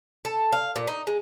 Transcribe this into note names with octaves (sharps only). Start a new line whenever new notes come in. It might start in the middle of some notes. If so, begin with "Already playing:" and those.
A4
F5
A#2
D#4
G#3